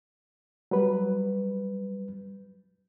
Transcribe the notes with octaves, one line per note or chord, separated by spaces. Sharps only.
F#3 G3 B4